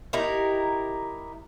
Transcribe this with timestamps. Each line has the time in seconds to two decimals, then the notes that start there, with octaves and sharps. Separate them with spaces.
0.13 D#4 E4 G4 A#4